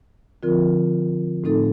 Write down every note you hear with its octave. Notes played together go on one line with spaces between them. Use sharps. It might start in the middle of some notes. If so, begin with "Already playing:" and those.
D3 F3 C4 F4 A#4
A2 A3 C4 D#4 A4